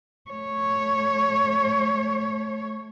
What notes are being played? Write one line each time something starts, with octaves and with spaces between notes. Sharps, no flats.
A3 C#5